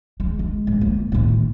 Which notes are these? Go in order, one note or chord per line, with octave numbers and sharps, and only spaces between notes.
G#3
G#3
G#2
A#3
A2 D#3